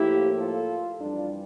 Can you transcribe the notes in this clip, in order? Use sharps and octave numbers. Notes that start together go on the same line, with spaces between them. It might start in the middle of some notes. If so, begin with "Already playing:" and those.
Already playing: A2 F3 A#3 E4 G4
F4 A4
F2 E3 G3 D4 F4